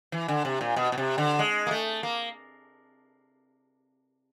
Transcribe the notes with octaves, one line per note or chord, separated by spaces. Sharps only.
E3
D3
C3
A#2
B2
B2
C3
D3
G#3
A#3
A3
A#3